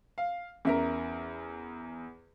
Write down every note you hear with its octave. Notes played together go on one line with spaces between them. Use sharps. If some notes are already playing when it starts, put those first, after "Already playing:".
F5
E2 C#4 A#4 E5